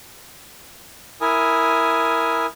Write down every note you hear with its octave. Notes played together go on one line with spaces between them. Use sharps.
E4 A#4 G#5 D#6